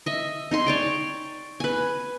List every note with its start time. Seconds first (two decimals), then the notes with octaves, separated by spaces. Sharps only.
0.06 D#5 E5
0.51 D#4 G#5 C6
0.66 C#5 D5 G5
1.60 B4 G#5